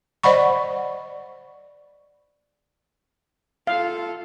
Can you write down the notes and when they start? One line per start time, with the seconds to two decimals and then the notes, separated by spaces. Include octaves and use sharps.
0.24 C5 D5 D#5 F#5 B5 C#6
3.67 F4 A4 F5